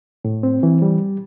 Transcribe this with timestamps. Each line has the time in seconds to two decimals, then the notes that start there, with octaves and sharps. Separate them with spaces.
0.25 A2
0.43 C4
0.63 E3
0.82 G3